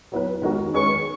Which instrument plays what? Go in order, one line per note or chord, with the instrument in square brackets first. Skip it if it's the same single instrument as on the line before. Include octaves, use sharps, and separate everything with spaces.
[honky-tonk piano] F#3 B3 E4 B4
D#3 G#3 B3 F#4 A#4
[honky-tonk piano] D#3 G#3 C#4 G#4 B4 [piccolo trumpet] C#6